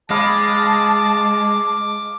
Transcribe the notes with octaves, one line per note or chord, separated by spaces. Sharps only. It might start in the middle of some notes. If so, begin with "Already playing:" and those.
G#3 D#5 F5 A5 B5 D6